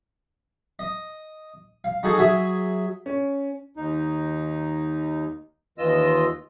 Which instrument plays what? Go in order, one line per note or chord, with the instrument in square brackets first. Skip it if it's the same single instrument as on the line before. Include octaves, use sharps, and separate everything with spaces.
[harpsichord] D#5
F5
D#4 F#4 G#4 A4
F#3 G#4 E5
[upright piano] C#4
[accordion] D#2 D#4
D#2 E3 F4 D#5 E6